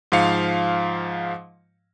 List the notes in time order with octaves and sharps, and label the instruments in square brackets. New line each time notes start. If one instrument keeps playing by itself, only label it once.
[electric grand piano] G#2 F3 F5 C#7